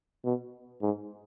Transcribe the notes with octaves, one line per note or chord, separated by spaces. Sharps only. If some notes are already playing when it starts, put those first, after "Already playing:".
B2
G#2